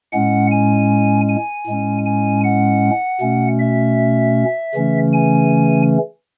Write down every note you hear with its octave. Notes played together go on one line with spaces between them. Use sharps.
A2 G#3 C#4 F#5
G#5
G#5
A2 G#3 C#4
G#5
F#5
B2 A3 C#4
E5
C#3 E3 A3 C#4
G#5